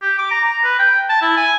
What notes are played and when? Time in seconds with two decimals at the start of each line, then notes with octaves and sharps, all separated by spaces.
0.02 G4
0.18 D6
0.31 A#5
0.44 A#5
0.64 B4
0.79 G5
1.10 A5
1.22 E4
1.37 G#5